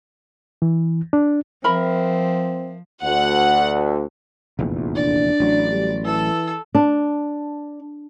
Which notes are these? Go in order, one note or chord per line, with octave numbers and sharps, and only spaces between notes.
E3
D4
F3 C4 A#4 E5 B5
D2 F#5
F1 A#1 E2
D4 D5
A1 F#3
G3
E3 A4 E6
D4